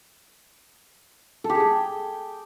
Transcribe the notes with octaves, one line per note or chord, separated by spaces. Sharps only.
A4
G4
G#4
G5